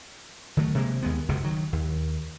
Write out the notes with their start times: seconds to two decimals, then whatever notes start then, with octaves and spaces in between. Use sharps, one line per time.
0.57 D#3 F#3 A3
0.75 C3 G#3 A#3
1.03 D#2 G#3 B3
1.29 F#1 C#2 F#2 C3
1.44 D#3 F#3
1.73 D#2